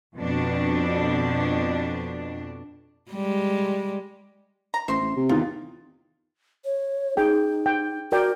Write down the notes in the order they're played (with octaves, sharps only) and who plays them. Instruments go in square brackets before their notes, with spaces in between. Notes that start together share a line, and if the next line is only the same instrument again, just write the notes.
[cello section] F2 B2 D4
[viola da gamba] G3 G#3
[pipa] A#5
[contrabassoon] A1 [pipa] C5 E5 C6
[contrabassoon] A1
C3
[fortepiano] E2 D#3 [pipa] F4
[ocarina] C#5
[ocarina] D#4 [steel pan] G#4 G5
[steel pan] G5
[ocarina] F#4 [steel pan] A#4 D5 G5